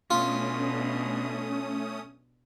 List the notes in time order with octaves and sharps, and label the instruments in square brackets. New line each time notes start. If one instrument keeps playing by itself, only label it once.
[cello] B2 D4 [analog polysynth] A3 C#4 D#6 [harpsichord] F4